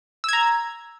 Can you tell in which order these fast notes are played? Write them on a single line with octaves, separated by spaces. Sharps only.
E6 G#6 A#5